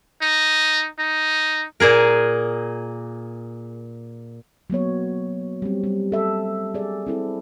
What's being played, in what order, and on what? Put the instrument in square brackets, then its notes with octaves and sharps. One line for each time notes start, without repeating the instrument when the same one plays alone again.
[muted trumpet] D#4
D#4
[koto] A#2 A#3 G#4 A#4
[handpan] F#3 A#3 B3 C#5
G3 C4
G3
A4 E5
G#4 D5
C4 E4 A4